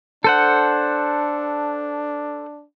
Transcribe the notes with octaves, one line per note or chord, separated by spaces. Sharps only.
D4 A4 C5 F#5